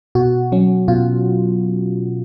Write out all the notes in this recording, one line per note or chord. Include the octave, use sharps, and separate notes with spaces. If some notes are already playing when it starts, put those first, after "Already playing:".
B2 F#4
F#3 C#4
B2 F4